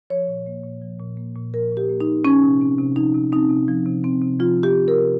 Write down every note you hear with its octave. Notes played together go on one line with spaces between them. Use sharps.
F3 C#5
A#2
A#3
A#2
F3
A#2
A#3
A#2
F3 A#4
A#2
G4
A#3
D#4
A#2
F3 C#4
C3
C4
C3
F3 D#4
C3
C4 D#4
C3
F3
C3
C4
C3
F3 F4
C3
G4
C4
A#4
C3